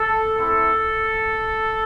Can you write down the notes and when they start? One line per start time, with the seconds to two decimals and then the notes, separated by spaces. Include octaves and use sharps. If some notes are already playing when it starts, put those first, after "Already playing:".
Already playing: A4
0.36 A3 C4 E4 A4